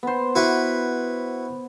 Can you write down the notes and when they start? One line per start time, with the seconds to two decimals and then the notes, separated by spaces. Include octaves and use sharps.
0.03 B3 C5
0.35 E4 F#4 B4